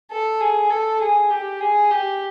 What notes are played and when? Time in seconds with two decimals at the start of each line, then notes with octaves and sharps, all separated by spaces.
0.12 A4
0.40 G#4
0.70 A4
1.02 G#4
1.30 G4
1.61 G#4
1.91 G4